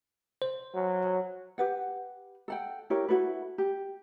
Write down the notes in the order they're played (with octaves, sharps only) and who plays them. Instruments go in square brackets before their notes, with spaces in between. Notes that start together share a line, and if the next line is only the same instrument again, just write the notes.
[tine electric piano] C5
[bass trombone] F#3
[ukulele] G4 B4 F#5
A4 F#5 G5
E4 G4 A#4 C#5
E4 F#4 A4 B4
G4